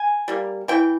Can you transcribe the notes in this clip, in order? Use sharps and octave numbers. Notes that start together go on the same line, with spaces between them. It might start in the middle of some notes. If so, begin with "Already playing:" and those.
Already playing: G#5
G3 A#3
E3 G5